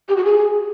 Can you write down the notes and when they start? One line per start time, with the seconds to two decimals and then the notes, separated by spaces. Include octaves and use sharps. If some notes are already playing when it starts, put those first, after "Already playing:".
0.09 G4
0.16 F#4
0.24 G#4